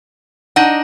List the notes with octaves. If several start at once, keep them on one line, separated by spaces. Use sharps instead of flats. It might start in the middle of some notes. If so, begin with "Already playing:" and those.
D4 D#4 D#5 F#5